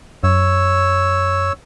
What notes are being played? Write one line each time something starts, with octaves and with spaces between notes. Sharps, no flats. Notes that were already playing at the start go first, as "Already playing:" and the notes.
F#2 C#5 E6